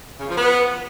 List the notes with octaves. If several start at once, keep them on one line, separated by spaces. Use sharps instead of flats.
C#3
F3
B3